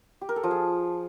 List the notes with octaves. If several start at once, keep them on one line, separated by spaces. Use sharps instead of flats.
G4
A#4
A4
F3
G#4